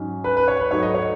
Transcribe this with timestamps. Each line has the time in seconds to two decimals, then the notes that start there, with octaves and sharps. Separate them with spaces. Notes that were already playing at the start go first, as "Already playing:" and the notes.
Already playing: G#2 F#3 C#4
0.24 B4
0.37 B4
0.48 C#5
0.60 B4
0.71 G#2 F#3 A3 D#4 C#5
0.82 D#5
0.94 C#5